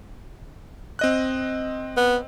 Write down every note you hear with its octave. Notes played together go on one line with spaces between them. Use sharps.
C4 D#5 F#6
B3